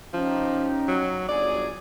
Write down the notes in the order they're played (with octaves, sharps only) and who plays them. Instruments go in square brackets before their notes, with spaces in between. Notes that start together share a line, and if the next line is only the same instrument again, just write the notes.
[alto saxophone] F3 [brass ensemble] C#4 D#4 G4
[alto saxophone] F#3
[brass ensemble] G1 F#3 G#4 [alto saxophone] D5